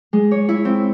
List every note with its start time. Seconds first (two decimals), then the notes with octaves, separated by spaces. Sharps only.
0.13 G#3
0.31 C#5
0.49 E4
0.65 C4